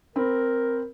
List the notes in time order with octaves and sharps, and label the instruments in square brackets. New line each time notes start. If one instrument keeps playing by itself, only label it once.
[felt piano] C4 B5 [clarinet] A#4